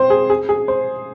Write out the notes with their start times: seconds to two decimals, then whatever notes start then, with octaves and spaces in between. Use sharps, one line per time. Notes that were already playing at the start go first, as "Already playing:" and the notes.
Already playing: C4 C5
0.10 G#4
0.30 G#4
0.49 G#4
0.68 C5